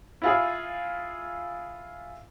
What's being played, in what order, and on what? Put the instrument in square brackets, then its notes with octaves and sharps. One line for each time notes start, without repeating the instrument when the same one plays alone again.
[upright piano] E4 F4 G#4